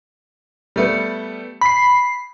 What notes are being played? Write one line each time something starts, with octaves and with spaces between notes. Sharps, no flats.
G3 A3 B3
B5 B6 C7